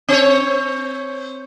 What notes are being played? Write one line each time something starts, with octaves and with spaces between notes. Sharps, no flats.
C4 C#5